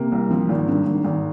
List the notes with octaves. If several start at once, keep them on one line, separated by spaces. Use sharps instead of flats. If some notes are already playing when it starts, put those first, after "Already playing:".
Already playing: C3 A#3
C2
F3
G#1
G2
G#1
G#1